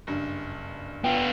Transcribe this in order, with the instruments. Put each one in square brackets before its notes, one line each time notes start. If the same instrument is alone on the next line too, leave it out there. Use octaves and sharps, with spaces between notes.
[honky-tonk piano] F#1 G2
[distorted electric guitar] B3 F4 [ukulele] G5